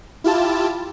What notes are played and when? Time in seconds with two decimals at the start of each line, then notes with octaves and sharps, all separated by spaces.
0.24 E4 F4 G4 A5